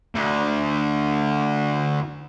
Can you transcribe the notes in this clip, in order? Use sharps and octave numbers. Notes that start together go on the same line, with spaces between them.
D2 D3